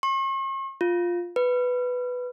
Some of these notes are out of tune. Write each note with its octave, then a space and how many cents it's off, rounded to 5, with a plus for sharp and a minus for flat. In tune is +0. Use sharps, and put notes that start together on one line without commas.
C#6 -45
F4 +5
B4 +5